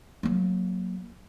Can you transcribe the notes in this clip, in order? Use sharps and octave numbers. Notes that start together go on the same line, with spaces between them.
F#3 A#3